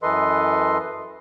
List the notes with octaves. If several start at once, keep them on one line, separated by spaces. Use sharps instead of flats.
F#2 E3 A4 B4 D#5 C6